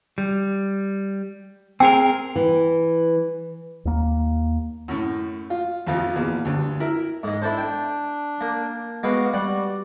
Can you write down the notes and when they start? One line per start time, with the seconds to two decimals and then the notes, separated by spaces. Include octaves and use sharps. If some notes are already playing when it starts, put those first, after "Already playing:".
0.18 G3
1.80 C4 G#4 A#4 G5 E6
2.36 E3
3.85 D#2 A#3
4.88 F#2 A2
5.50 F4
5.87 A1 F2 F3
6.16 E2 A#2
6.45 D2 G2
6.80 E4 A#4
7.23 G#2 G#3
7.42 D4 E4 A4 C5
7.58 G5
8.41 A#3
9.03 G#3 B3 F#4 F5 D6
9.33 G3 F#4 F#5